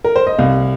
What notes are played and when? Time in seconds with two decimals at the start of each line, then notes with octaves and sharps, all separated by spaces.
0.04 A#4
0.16 C5
0.27 D#5
0.39 C2 F5